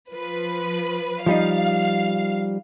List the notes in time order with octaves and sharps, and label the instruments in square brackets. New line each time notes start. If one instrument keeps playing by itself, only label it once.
[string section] F3 B4
[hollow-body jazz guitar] F3 G3 D#4 [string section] F5